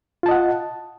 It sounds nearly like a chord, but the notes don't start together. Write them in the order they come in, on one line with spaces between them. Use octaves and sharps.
F4 A5 D#5 F#5